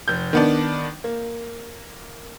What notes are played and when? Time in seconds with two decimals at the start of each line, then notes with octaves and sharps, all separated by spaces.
0.08 F1 G6
0.33 D#3 B3 D4
1.04 A#3